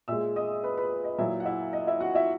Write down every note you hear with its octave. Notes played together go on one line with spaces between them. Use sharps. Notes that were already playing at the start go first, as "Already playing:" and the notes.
A#2 G#3 E5 E6
D#5 D#6
B4 B5
B4 B5
D#5
A#2 F#3 E4 E5
F#5
E4 E5
D#5
E4 E5
F#4 F#5
E4 E5